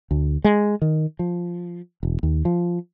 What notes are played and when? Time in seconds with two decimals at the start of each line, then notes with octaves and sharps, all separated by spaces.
0.11 D2
0.44 G#3
0.82 D#3
1.19 F3
2.03 E1
2.23 D#2
2.45 F3